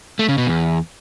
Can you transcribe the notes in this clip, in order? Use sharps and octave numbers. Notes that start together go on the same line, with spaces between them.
A3
C#3
B2
E2